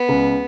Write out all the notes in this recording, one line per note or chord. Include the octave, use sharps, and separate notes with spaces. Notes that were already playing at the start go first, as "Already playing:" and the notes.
Already playing: B3
C#2